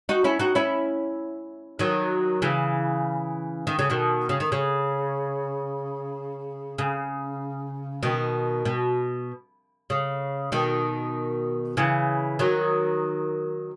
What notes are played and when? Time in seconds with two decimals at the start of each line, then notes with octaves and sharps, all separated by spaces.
0.09 D#4 F#4
0.24 C#4 E4
0.39 D#4 F#4
0.55 C#4 E4
1.79 D#3 F#3
2.42 C#3 E3
3.67 D#3
3.79 C#3
3.90 B2 D#3
4.29 C#3
4.40 D#3
4.52 C#3
6.78 C#3
8.03 B2 D#3
8.65 B2
9.90 C#3
10.52 B2 D#3
11.77 C#3 E3
12.39 D#3 F#3